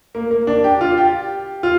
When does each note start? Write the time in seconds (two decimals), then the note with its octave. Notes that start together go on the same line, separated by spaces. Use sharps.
0.15 A#3
0.31 A#3
0.47 D4
0.64 G4
0.81 F4
0.98 G4
1.63 F4